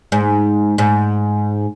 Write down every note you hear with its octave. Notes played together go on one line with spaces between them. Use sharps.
G#2
G#2